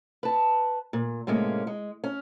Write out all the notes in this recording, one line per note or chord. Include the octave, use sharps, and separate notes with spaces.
B4 A5
A#2
A2 C3 G#3 A#3 C#4
G#3
C#4